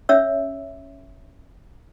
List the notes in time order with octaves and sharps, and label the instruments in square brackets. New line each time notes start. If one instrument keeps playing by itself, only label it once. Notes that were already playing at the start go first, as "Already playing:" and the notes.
[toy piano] C#4 C#5 E5 E6